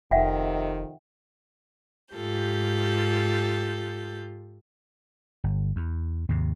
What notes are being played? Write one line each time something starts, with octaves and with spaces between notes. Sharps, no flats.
F1 F2 C3 D#3 E5 F#5 G5
G#2 F4 G4 A4 G6
G1
E2
D#2 G#2 C3